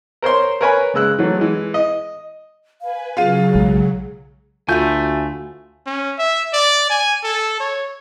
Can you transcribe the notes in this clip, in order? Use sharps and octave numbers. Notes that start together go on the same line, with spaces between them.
A#4 C5 C#5 C6
A#4 B4 C#5 G#5 A#5 B5
C#3 G#3 E6 F#6
E3 F#3 A3
E3 G#3
D#5
B4 F5 G#5
C#3 F#3 F4 G#4 F5 D#7
B1 G#3
D2 A3 F4 F#4 G#5 B5 G6
C#4
E5
D5
G#5
A4
C#5